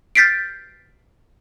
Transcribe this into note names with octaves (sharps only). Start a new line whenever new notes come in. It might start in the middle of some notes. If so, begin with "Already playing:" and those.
F6 G6 A6 B6 C7 D7